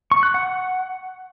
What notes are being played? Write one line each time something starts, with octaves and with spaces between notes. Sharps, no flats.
C#6
F#6
F#5